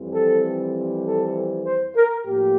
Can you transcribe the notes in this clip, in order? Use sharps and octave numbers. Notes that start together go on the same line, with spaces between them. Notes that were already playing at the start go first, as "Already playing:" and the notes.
Already playing: F2 E3 G3 C4
A4
A4
C5
A#4
A2 F3 A#3 G4